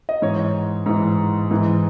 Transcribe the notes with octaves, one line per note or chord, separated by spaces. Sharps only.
D#5
G#2 E3 C#5
G#2 E3
G#2 E3